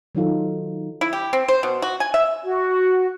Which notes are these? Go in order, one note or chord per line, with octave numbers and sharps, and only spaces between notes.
D#3 F#3 D#4 F4 A4
E4
G4
C4
C5
B2
F#4
G#5
E5
F#4